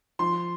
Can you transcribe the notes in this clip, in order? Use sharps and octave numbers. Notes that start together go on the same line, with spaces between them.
F3 C6